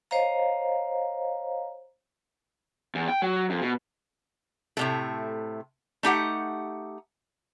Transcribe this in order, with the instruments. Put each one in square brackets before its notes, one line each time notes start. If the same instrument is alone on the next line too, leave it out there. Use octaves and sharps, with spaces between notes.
[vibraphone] C5 C#5 D#5 F5 A#5
[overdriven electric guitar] E2
G5
F#3
F2
B2
[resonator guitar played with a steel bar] A2 C3 A3
A3 D#4 G4 F#5